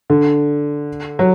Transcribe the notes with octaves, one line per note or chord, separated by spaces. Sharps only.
D3
F#3